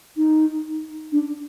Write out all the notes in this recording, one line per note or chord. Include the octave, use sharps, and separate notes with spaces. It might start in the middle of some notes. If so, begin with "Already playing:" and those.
D#4
D4